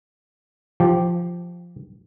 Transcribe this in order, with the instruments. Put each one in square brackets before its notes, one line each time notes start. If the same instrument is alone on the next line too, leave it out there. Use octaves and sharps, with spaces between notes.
[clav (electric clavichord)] F3 G4